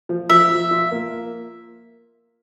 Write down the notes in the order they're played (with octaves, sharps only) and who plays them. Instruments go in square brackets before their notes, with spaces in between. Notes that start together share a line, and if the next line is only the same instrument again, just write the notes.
[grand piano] F3
[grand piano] F3 [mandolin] E5
[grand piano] F3
F4
A#3